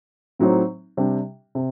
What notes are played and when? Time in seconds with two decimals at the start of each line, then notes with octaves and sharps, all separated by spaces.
0.39 A2 F#3 C4 D#4
0.97 C3 G3 D4
1.55 C3